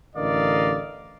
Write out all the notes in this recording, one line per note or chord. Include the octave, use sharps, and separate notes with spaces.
A1 D3 A#4 D5 D#5 F5